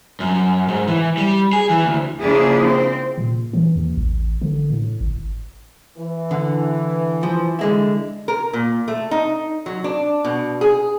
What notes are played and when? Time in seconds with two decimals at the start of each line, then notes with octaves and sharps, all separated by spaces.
0.20 F#2
0.68 G#2
0.88 E3
1.17 G3
1.53 G#4
1.70 E3
1.85 D2
2.19 C#3 F3 A#3 D4 E4 G#4
2.63 C4
3.18 A#2
3.53 E3
3.76 D#2
3.97 A1
4.42 D3
4.70 A2
5.00 G#1
5.98 E3
6.31 D3
7.23 F3
7.59 D3 G#3 E4
8.28 A#4
8.53 A#2
8.88 A3
9.11 D#4
9.66 F#3
9.84 D4
10.24 B2
10.61 G#4